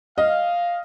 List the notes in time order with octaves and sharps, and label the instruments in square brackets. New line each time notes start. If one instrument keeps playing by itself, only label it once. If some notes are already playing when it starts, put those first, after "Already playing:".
[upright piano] D#5 [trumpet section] F5